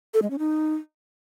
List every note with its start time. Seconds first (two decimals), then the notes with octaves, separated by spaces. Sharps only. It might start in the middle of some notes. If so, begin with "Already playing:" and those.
0.14 A4
0.22 G#3
0.30 C#4
0.39 D#4